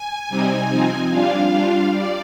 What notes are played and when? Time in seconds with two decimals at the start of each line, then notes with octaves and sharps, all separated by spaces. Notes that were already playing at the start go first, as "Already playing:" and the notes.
Already playing: G#5
0.29 C3 G3 C4 D#4
0.69 F3 C4 D#4
1.10 G3 D4 F4 F5
1.52 G3 D4 F4
1.92 G3 D5